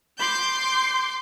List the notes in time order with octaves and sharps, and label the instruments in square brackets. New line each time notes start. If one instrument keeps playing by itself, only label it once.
[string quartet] C6 D6 G6